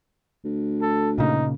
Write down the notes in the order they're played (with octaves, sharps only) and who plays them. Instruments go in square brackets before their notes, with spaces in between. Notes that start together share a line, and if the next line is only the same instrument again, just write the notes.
[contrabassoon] D2
[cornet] A4
[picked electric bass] A#2 C#3 A#3 [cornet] D#4